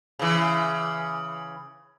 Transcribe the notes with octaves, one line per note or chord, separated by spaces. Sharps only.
C#3 E3